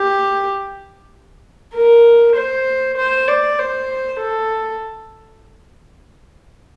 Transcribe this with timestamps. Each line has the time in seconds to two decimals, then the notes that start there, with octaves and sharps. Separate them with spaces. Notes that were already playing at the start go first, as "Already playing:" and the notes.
Already playing: G4
1.75 A#4
2.36 C5
2.97 C5
3.28 D5
3.59 C5
4.20 A4